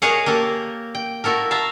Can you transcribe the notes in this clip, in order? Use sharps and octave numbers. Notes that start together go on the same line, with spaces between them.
G#4 A#4 C#5 D#5 F5 F#5
A#3 G4 A4 A#4
G5
E4 F#4 A4 A#4
E5 F5 A5 A#5